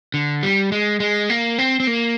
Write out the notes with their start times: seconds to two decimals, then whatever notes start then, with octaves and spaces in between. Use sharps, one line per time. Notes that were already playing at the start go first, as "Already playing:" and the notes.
0.14 D3
0.43 G3
0.72 G#3
1.00 G#3
1.30 A#3
1.58 C4
1.80 C4
1.87 A#3